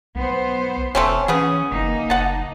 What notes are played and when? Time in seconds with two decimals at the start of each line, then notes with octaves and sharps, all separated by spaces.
0.15 B1 B3 C5
0.95 E1 A3 C4 C#4
1.28 C#3 E3 B3 C#4 G#4
1.72 F#1 A#3 D#4
2.10 F#1 F#5 A5